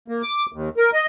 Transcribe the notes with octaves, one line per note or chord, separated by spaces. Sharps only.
A#3
D6
D#2
A#4
D#5